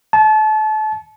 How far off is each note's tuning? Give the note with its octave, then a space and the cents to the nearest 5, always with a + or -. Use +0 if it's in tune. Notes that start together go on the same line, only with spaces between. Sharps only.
A5 -30